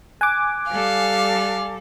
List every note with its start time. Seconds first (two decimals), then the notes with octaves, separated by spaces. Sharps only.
0.21 G#5 D6 F#6
0.70 G3 A4 F5